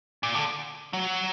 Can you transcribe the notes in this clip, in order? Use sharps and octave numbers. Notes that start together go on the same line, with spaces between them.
A#2
D3
F#3